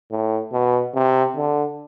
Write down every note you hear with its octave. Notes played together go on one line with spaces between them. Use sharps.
A2
B2
C3
D3